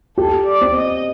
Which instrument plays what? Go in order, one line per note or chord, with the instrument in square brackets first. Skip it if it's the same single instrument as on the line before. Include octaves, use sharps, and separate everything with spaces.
[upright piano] G4 [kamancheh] A4
[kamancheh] D5
[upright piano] C4
[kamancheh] D#5